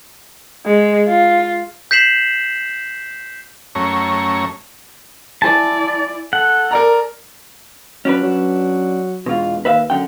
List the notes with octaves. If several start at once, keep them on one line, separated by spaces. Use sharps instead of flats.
G#3
F4
G6 B6 C7 E7 F#7
F#2 A3 C#4 C#5 A#5
E4 D5 G#5 A5
A4 F#5
A#4 D5 A#5
F#3 C#4 D4 B4
F#3
E1 B2 F4
D#2 B4 E5 F5
F#2 D3 G5